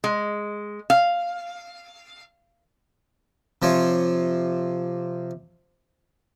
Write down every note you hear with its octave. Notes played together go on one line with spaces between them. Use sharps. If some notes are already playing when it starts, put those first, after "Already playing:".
G#3
F5
C3 F3 C#5